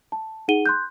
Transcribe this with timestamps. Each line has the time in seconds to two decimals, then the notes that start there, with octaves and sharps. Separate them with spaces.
0.12 A5
0.48 D#4 G#4 F#5 D#7 G7
0.66 C6 F#6 G6